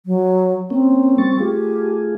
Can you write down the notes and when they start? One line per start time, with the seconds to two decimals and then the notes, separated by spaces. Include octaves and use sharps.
0.06 F#3
0.70 A#3 C4 C#4
1.18 G3 C#6 A6
1.40 A3 F4 G4 G#4